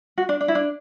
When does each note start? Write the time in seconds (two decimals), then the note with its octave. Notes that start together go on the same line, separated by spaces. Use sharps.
0.18 F#4
0.29 D4
0.41 D4
0.48 E4
0.55 D4